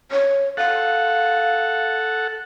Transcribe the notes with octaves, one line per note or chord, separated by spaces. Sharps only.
C#5
A4 F5 F#5